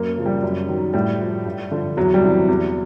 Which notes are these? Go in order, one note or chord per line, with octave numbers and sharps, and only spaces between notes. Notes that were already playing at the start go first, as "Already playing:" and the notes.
Already playing: F#2 A#3
C#3 F3
G3
F#2
D#3 F#3
A2 G3
F3
G2
D3 F3
E2 F#3
G3
C3 E3
E2